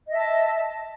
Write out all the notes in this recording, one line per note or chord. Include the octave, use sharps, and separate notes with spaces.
D#5 E5 A5